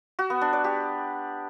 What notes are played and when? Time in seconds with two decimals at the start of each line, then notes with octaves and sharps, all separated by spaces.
0.19 F#4
0.30 B3
0.41 D4
0.53 D5
0.64 G4